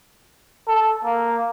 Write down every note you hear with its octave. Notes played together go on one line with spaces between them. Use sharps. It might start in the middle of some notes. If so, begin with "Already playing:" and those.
A4
A#3